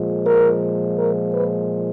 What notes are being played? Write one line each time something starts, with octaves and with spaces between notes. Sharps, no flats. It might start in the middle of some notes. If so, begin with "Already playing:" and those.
Already playing: A#2 F3 G#3
A#4
A#4
B4